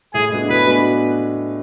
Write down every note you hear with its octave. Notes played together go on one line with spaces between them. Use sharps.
A2 G#4
G#3 B3 D4 F#4
A2 B4
G#3 B3 D4 F#4